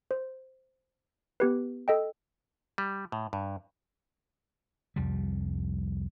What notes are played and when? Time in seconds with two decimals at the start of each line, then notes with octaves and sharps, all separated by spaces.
0.11 C5
1.40 B3 G4 B4
1.88 A4 D#5 G5
2.78 G3
3.12 A2
3.33 G2
4.96 C2 F2 G3